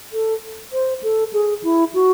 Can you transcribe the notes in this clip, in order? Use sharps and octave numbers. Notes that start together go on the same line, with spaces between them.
A4
C5
A4
G#4
E4
F#4